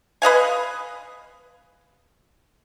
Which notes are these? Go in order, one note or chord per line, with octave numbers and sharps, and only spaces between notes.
B4 D#5 F5 G#5